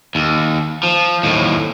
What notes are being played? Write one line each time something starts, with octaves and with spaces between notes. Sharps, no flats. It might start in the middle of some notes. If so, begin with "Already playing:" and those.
D#2
F3
D#2 A2